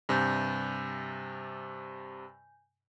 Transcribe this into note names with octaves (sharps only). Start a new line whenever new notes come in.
G2 C3 G#5 G6